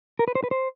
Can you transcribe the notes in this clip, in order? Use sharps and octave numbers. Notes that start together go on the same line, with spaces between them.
A#4
B4
C5
B4
C5